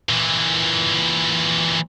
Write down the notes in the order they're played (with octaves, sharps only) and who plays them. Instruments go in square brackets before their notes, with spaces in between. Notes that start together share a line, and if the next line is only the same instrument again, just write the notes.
[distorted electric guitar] A#2 E3